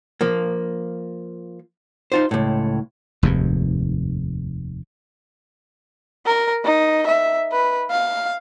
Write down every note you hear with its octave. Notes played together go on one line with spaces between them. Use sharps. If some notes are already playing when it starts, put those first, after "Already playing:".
F3 A#3
D#4 F4 C5
C#2 A2
F1 D#2 G#2
A#4
D#4
E5
B4
F5